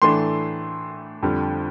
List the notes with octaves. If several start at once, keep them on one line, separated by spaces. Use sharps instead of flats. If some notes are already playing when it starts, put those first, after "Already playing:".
A2 E3 A3 D4 C6
F2 D3 G3